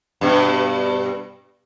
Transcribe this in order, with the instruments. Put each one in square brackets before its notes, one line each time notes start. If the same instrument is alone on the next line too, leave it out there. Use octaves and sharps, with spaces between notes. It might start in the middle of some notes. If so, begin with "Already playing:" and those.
[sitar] G2 B2